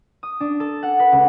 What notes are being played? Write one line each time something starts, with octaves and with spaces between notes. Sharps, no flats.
D#6
D4
A4
F#5
B4
C#2